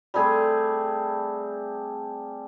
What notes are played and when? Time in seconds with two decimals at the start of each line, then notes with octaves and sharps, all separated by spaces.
0.14 G3 A3 C4 G#4